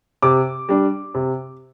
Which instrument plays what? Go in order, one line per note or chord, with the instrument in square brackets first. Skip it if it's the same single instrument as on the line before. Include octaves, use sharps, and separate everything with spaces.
[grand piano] C3 D6
G3 D4
C3